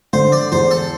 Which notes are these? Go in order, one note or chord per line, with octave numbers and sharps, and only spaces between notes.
D3 C5
D5
E2 C5
A4